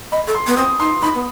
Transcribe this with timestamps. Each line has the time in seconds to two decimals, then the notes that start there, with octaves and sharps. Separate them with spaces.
0.12 D#5 B5
0.27 A4
0.35 C6
0.47 B3
0.57 C4 D#6
0.80 D#4 C6
1.02 D#4 B5
1.15 B3